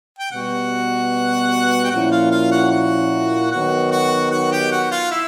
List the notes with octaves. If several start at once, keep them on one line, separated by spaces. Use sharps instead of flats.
G5
B2 G3 B3 F#4 F#5
G5
A#2 F3 A#3 C#4 E4 F#4 F#5
F4 F5
F4 F5
F#4 F#5
F#4 F#5
D#3 F#3 B3 F#4 F#5
F#4 F#5
F#4 F#5
G4 G5
F#4 F#5
F4 F5
E4 E5